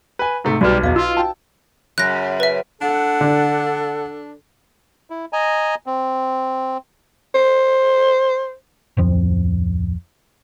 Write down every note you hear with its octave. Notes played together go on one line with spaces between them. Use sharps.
B4 G#5
G#2 C3 A3
B1 G3 D#4 F#4 B4
E2 D#5 F5
F4 E6
G5 A5
F#2 C#3 F#6 A#6
B4 E5
D4 A4 F#5
D3
E4
D#5 G#5 A#5
C4
C5
D1 F2 F3